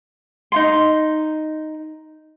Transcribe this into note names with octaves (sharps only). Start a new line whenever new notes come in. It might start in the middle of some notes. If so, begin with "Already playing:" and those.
D#4 F4 C6